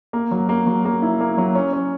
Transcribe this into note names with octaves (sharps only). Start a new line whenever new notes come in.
A#3
F#3
A#3
F#3
A#3
E4
A#3
F#3
C#4
C#4